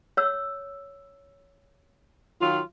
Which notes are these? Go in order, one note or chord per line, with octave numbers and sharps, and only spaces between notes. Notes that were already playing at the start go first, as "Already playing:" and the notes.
C#5 E6
D#3 F#3 F4